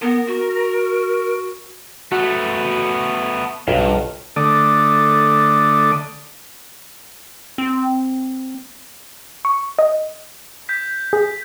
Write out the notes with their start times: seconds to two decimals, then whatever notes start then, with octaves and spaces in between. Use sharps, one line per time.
0.02 B3 A#4
0.27 F#4
2.12 A3 B3 F#4
3.68 B1 G2 F4
4.36 D3 A3 D5 D#6
7.58 C4
9.45 C#6
9.79 D#5
10.69 G6 B6
11.13 G#4